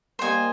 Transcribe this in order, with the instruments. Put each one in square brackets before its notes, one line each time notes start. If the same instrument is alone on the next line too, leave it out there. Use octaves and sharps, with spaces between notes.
[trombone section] G3 A#3 [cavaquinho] C5 D#5 G#5